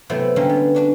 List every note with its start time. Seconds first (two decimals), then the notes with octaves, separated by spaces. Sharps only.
0.09 C3 F#3 A3 B3 E4 C5
0.36 D3 G3 A#3 C4 C#4
0.49 B3
0.75 C#4 D4 F#4